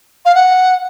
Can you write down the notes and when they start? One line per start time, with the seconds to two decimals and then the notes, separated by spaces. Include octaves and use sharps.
0.25 F5
0.35 F#5